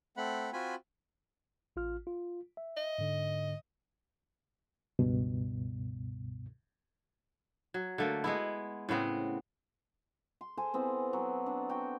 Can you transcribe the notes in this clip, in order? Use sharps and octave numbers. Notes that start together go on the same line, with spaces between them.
A3 C4 F#5 B5
C4 F4 F#4 G#5 B5
A1 F4 F6
F4
E5
D#5
G#2 D3
C#2 G2 B2
F#3
D3 A3 A#3
G#3 B3 E4
A2 C#3 B3 C4
C6
A4 C5 G#5
E3 B3 C4
F#3
D4
F#4 G5